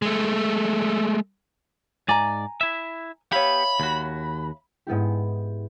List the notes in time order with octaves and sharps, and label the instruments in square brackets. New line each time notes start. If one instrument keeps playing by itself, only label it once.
[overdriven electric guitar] G#3 A3
[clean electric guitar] G#2 D5 [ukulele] G#5 A#5
[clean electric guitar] E4 E5
[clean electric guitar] B3 G4 [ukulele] C#5 E5 F5 [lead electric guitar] B5
[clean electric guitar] D#2 F#4
[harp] G#2 B3 E4 G4